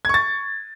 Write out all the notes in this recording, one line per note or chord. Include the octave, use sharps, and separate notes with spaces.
C#6 G#6 A6